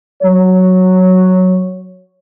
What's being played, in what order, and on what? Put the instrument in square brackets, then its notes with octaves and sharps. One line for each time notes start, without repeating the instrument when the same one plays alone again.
[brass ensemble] F#3 C#5